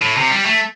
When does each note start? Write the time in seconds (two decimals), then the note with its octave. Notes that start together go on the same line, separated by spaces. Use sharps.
0.02 A2
0.17 C3
0.31 G3
0.46 A3